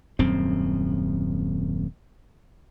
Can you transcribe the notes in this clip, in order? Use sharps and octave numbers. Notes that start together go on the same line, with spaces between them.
D#1 F#2 C4